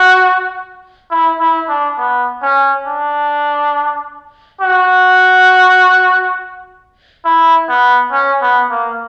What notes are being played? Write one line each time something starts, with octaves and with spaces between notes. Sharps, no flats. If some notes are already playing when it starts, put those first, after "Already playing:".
Already playing: F#4
E4
E4
D4
B3
C#4
D4
F#4
E4
B3
C#4
B3
A#3